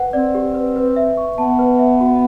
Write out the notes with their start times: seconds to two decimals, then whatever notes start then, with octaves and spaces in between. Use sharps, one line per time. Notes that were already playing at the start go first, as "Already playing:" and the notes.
Already playing: B4 F#5
0.13 C4 D5
0.35 G4
0.54 B4
0.76 B4
0.96 E5
1.17 C#6
1.38 B3 A5
1.59 B4
1.79 E5
2.01 F#4